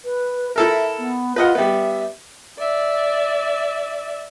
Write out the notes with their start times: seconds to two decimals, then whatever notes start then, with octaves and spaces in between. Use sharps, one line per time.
0.05 B4
0.56 E4 A4 A#4 E5
0.99 B3
1.36 F4 B4 D#5 F#5
1.55 G3 B3 E5
2.58 D5 E5